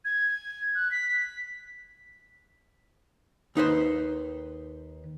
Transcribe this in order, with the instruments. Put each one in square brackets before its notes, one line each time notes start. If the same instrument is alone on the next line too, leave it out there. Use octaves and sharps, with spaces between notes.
[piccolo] G#6
F#6
B6
[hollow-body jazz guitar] D#2 D#4 B4 C5